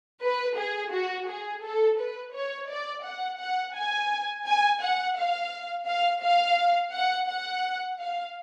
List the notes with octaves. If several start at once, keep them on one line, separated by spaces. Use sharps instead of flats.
B4
G#4
F#4
G#4
A4
B4
C#5
D5
F#5
F#5
G#5
G#5
F#5
F5
F5
F5
F#5
F#5
F5